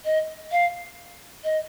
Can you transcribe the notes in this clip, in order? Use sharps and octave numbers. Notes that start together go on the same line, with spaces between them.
D#5
F5
D#5